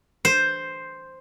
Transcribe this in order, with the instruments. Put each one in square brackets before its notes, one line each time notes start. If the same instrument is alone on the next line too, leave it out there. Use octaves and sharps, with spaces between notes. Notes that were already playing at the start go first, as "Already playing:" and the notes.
[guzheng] C5